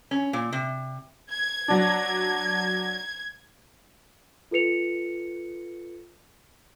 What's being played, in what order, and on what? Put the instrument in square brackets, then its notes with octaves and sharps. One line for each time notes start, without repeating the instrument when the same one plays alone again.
[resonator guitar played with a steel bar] C#4
A#2
C3
[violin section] G#6
[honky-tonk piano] F#3 D4
[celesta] F4 A4 B4 C#7 F7